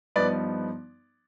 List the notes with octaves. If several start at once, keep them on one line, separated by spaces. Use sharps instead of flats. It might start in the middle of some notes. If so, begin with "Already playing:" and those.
G2 F3 B3 D#4 B4 D5